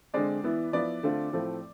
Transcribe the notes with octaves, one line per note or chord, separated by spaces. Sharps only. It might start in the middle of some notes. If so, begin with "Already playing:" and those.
D3 G#3 C4 D5
E3 B3 E4
F3 B3 E4 D5
D3 A3 C4 F4
A2 F3 A3 C4